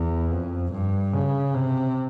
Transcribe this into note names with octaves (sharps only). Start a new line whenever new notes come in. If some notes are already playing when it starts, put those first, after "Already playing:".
Already playing: E2
F2
G2
C#3
C3